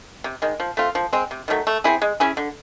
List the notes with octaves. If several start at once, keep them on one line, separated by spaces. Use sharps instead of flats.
C3
D#3 G#3
F3
A3 C4 F4
F3
G#3 C4
C3
D#3 F#3 A3
A3
C4 E4 G#4
G#3
C#4 E4 G#4
D3